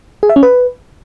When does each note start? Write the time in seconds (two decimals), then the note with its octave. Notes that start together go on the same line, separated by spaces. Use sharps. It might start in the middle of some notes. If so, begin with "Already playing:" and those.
0.23 G#4
0.29 E5
0.36 C#4
0.43 B4